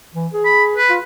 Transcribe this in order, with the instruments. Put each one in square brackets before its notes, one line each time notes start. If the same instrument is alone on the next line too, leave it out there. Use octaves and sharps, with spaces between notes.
[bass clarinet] E3
G#4
[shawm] B5
B4
[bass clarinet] F4